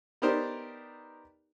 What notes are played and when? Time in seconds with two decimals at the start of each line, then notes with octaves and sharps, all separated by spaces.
0.22 B3 D#4 G4 A#4 C5 D5